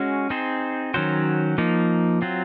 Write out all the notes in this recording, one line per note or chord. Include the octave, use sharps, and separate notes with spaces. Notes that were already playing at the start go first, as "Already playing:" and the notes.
Already playing: G#3 C#4 F#4
C4 D#4 G#4 C5
D#3 F#3 C#4 F#4 C5
F3 A#3 D#4
F#3 C4 F4